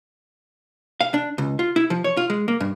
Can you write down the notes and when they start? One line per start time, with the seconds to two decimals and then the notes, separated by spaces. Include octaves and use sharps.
1.01 F5
1.14 D4
1.38 C#2
1.59 F4
1.76 E4
1.90 F3
2.04 C#5
2.17 F4
2.30 G#3
2.48 A#3
2.60 G2